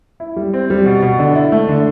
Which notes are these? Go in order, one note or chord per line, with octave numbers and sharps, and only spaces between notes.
E4
G3
C4
G3
B2
B2
D3
E4
A3
D3